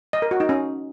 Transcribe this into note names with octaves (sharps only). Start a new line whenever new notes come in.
D#5
A#4
F#4
D#4
C#4